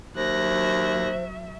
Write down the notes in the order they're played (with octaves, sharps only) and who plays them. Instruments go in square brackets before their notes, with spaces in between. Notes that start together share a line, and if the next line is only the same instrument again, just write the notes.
[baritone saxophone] D#2 [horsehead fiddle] F#3 E5 [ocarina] C5 [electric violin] F#6 A#6